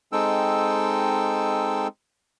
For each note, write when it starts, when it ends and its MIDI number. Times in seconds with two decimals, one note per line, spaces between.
0.12 1.87 56
0.12 1.87 60
0.12 1.87 63
0.12 1.87 69
0.12 1.87 79
0.12 1.87 88